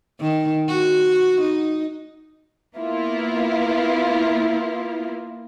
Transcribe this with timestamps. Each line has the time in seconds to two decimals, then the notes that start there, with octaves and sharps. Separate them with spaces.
0.21 D#3
0.68 F#4
1.41 D#4
2.76 A#3 B3 E4 F4